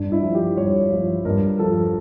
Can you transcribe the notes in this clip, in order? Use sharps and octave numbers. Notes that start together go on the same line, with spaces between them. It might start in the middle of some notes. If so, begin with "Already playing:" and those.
Already playing: G2 D4
E4
F3
G4
G2 C#5
F3
G2 A#4
F3 A4